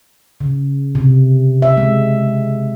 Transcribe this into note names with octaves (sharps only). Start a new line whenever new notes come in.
C#3
C3
E5
G#3